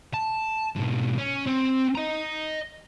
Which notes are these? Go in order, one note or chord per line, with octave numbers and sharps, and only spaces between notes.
A5
G#2 B2
C#4
C4
D#5 A#5